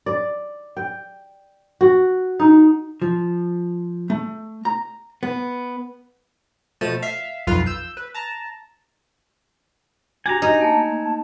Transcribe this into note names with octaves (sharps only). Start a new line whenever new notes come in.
D5
G5
F#4
D#4
F3
A3
A#5
B3
B2 F3 A3 A5 D#7
E5 F5
B1 F2 F4 B4 F5
E6 G6
B4
A5 A#5
D4 F#4 G4 G#5 A#5
D#4
A3 A#3 A5